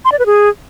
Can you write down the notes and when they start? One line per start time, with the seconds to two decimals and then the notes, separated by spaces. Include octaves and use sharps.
0.05 C6
0.12 D5
0.19 B4
0.26 G#4